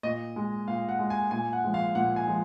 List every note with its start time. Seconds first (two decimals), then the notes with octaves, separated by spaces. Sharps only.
0.03 A#2 D#5
0.36 G#3
0.68 A#2 F5
0.89 F#5
0.99 G#3
1.10 G#5
1.31 A#2 G#5
1.53 F#5
1.64 F3 G#3
1.74 F5
1.95 A#2 F#5
2.16 G#5
2.27 F3 G#3